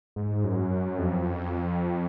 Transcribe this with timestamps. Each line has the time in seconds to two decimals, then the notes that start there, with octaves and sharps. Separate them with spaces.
0.16 G#2
0.44 F#2
0.98 F2